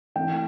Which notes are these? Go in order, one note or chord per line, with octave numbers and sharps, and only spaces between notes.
E3 A3 C4 G5